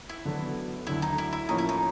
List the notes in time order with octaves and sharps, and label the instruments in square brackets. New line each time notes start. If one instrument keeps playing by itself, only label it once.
[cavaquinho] E4
[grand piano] D3 F#3 B3
[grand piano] D2 D3 F#3 [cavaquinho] E4
[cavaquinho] D#4
E4
E4
[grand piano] A2 F3 A#3 C#4 [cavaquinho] D#4
[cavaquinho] E4
D#4